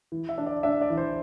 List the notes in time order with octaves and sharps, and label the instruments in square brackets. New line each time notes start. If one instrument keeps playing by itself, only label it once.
[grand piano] E3
E5
D4
D5
D4 E5
D5
E3
C5